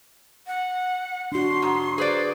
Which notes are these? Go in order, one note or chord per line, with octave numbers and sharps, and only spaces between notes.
F#5
D4 F#4 C6
G#2
G#4 B4 C5 D5